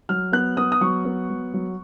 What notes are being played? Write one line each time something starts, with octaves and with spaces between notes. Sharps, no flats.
F#3 F6
B3 F#6
B3 D#6
D#6
F#3 C#6
B3
F#3
F#3